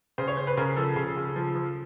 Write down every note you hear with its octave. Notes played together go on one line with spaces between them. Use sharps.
C#3 C5
C#5
C#3 C5
B4
C#3 A#4
F3 A4
C#3
C#3
F3
F3